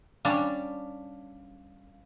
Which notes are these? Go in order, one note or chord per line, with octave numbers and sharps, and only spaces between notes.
G3 C#4 D4 F5